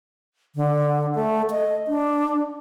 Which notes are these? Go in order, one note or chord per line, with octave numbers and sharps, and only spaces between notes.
D3
A3
D#5
D4